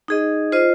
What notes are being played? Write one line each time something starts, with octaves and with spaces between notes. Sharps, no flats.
D#4 G#4 D#5
F4 C5 D#5